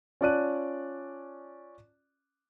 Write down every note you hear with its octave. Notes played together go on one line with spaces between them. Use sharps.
C#4 F4 D5 A5 F#6 D#7